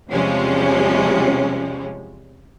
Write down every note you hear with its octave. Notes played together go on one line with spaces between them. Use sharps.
E2 C3 F3 G3 G#3 C#4